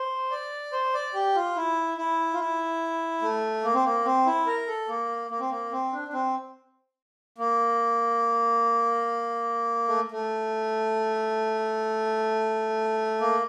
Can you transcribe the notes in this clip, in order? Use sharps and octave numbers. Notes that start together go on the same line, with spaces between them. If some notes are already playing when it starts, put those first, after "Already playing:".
Already playing: C5
D5
C5
D5
G4
F4
E4
E4
F4
E4
A3
A#3
C4
A#3
C4
E4
A#4
A4
A#3
A#3
C4
A#3
C4
D4
D4
C4
A#3
A3
A3
A#3